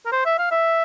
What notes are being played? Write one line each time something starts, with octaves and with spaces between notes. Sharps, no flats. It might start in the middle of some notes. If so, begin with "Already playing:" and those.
A#4
C5
E5
F5
E5